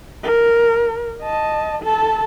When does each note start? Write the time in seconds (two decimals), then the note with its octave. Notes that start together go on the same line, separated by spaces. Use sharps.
0.24 A#4
1.22 D#5 A5
1.83 A4 A5